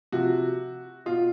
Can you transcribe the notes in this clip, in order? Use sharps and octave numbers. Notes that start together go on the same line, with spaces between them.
C3 F3 F#4
B2 F4